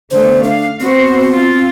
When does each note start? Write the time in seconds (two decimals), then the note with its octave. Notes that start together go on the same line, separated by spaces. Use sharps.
0.11 D3 A3 B3 C5
0.43 D4 F5
0.80 B3 C4 F#4 C5
1.31 F4